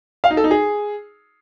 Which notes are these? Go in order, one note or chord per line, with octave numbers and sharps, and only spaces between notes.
F5
D#4
A4
D#4
G#4